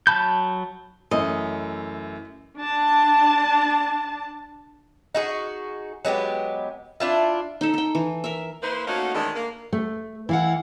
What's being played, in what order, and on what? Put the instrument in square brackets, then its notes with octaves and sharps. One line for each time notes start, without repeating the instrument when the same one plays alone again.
[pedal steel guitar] F#3 A5 B5 G6
[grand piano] F#2 E3 A3 [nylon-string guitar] D#5
[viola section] D4 A5
[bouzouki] D#4 F#4 G#4
F#3 G#3 B3 G4
D4 E4 F4
[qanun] D#4 A4
A4 G5
E3
A#4 E5
[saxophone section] A#3 E4 B4 C5
A3 A#3 C#4 D#4 F#4
D#3 E3 F#3 G#3 A3 D4
A#3
[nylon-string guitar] A3
[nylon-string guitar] E3 [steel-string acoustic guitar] E4 F5 F#5